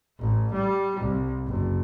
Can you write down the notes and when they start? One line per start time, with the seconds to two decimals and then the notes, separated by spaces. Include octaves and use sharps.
0.19 A1
0.53 G3
0.99 C2
1.45 F#1